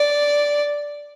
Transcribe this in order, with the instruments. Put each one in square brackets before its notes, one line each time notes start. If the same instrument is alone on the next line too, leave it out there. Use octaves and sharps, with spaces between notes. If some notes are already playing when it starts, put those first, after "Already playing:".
Already playing: [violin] D5